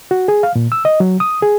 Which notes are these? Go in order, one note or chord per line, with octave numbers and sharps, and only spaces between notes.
F#4
G#4
F5
A#2
E6
D#5
F#3
D#6
G#4